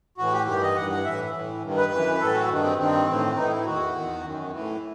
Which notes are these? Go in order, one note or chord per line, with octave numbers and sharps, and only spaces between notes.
A2 E3 F#4
G4
G2 D#3 G4
D#5
G2 E3 F#5
F#5
A2 E3 E5
A2 E3
G2 D#3
B4
F#2 E3
A2 E3 A4
F#4
G2 D#3
C4
G2 D#3 C4
A2 E3
A2 E3 D#4
E4
E2 D#3 F#4
E2 D#3
F#2 D#3
A2 E3